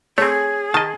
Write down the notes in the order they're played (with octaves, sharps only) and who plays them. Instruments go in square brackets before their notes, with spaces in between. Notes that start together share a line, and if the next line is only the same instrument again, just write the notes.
[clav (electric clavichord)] A3 C4 [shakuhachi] G#4 [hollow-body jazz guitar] C#5
[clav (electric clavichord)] D#3 D#5 [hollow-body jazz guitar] A5